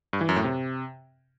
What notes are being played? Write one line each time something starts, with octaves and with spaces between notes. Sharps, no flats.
G2
E3
F#2
A2
C3